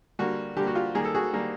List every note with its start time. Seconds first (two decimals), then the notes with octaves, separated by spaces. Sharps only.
0.19 D3 G3 A#3 F#4
0.57 D3 G3 A#3 G4
0.67 F#4
0.75 F4 G4
0.95 D#3 G3 A#3 G#4
1.05 A4
1.15 F#4 G#4
1.33 D#3 G3 A#3